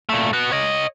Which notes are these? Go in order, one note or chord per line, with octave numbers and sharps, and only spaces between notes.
A#2 A3
B3 F#4
C#5 D#5